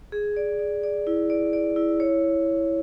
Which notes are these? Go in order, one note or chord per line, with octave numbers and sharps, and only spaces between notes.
G#4
D5
D5
D5
E4
D5
D5
E4
C#5